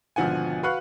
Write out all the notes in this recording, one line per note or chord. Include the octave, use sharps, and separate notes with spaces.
G#1 B2 D3 F3 F#5 G#5
F#4 B4 F5 F#5 C#6 F#6